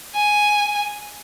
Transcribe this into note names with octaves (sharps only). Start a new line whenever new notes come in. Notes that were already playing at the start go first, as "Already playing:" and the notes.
G#5